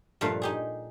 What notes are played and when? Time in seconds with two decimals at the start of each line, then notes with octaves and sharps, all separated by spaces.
0.21 G2 A#2 F3 A3 D5 F5
0.42 D#4 G4 G#4